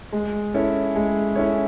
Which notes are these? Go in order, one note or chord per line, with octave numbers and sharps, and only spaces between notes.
G#3
C#4 E4 A4 C#5
G#3
C#4 E4 A4 C#5